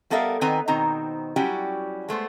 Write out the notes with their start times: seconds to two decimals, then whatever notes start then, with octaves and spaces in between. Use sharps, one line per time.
0.10 G3 B3 A4 A#4 E5 F5
0.41 D#3 B3 C4 B4 G#5 A#5
0.68 B2 D#3 C4 D#4 C5 A#5
1.36 F#3 G3 C#4 E4 F#4 G4
2.09 G#3 A3 B3 C5